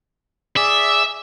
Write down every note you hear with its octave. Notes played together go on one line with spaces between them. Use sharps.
G#4 D5 E5